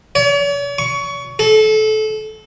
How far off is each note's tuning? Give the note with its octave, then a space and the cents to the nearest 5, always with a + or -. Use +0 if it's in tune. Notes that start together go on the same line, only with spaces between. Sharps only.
C#5 +45
C#6 +20
A4 -25